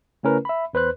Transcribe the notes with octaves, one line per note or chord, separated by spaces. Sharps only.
C#3 A3 C#4 E4 A#4 B4
E5 B5
E2 B4 C5 F#6